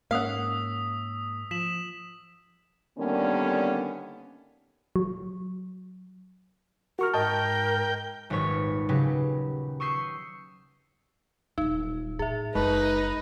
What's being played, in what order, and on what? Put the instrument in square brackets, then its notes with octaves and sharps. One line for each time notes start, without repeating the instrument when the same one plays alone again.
[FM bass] G#2 [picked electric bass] A#3 C#4 [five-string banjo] F5 F#5 [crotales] D#6 E6 B6
[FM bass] F3 [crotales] B6 E7 F#7
[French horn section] D3 D#3 G3 A#3 B3 C#4
[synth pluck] F#3
[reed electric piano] F#4 C#6 F6 [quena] A#4
[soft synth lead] G#2 [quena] A#4 [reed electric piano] D#5 A5 [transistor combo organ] G5
[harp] D#1 G#1 F#3 B4 C#5 B6
C#3 F#3 G4 B4
C#6 D#6 E6 G6 B6 C7
[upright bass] D#1 F#3 [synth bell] D#4
[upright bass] A2 [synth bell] G#4 E5
[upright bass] F#1 [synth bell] G#3 [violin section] D#4 [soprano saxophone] B4